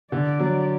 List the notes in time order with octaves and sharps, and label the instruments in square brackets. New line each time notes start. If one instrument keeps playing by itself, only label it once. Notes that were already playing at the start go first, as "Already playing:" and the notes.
[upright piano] D3 [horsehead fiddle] D5
[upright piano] F#3